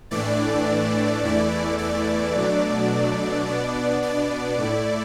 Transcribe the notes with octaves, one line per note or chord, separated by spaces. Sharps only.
A2 E3 A3 D4 D5
E2 E3 A3 E4
D5
B2 F#3 A3 D4
B2 B3 D4
D5
A2 A3 E4